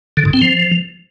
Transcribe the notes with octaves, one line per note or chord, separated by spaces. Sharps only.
D3
G#2
C4
F3